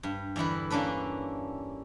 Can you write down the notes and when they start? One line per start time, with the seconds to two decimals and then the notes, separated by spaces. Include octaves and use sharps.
0.03 G2
0.36 E2 D3 E4 B4
0.70 A#3 C#4 D4 A4 B4